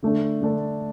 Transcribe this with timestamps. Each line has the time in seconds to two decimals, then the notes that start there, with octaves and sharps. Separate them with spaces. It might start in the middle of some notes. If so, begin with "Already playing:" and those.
0.03 D3 A3 D4 A4
0.41 D3 A3 D4 A4